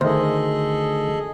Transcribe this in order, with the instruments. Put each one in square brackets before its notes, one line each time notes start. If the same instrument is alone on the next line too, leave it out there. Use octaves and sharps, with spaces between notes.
[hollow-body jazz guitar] D2 [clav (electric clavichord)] D#3 C5 [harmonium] G#4 A4 D#5